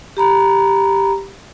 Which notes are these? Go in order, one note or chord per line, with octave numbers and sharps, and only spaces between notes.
G4 A#5 B5